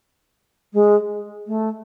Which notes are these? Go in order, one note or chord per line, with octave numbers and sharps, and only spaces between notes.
G#3
A3